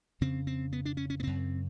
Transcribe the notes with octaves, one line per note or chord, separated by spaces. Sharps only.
F2 C#3 C4
C4
B3
D4
C#4
C#4
B3
F#2 C#3 C4